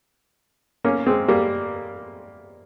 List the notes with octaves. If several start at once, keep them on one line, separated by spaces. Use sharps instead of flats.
A#3 C#4
G#3 C4
G3 A#3